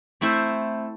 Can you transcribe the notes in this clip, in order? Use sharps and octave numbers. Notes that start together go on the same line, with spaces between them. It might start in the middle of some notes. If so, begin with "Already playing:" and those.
A3 C4 E4 C5 E5